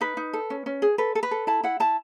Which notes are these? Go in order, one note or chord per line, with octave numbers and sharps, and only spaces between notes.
D#4 B4
D#4
A4
C#4
C#4
G#4
A4 B4
A4
B4
A4
E4 A5
E4 F#5
E4 A5